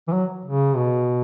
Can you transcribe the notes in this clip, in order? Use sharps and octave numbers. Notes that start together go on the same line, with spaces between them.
E3
F#3
C#3
B2